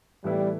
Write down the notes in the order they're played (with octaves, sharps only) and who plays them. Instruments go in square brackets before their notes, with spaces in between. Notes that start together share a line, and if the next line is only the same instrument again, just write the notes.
[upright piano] A2 E3 B3 E4 A4 [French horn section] G3